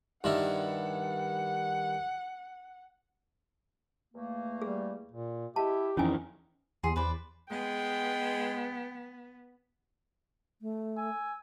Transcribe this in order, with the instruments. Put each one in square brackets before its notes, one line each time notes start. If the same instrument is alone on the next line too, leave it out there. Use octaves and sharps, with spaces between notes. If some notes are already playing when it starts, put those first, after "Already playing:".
[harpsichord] G2 D#3 E4 [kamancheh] F#5
[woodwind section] E2 A3 A#3
[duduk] G3 [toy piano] G#4
[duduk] A#2
[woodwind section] G#3 E4 E5 [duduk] G4 [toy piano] A5
[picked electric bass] F2 E3 [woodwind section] C3 D#3 [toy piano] C#4 G#5 [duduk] D#4
[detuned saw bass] E2 [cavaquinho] G#4 C6
[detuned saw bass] E2 [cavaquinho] B4 C5 D5
[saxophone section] G#3 [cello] B3 [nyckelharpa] G5
[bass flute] A3
[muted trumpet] G#5 [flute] E6